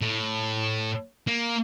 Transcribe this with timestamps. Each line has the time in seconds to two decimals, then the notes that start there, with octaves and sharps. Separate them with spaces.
0.02 A2
1.27 A#3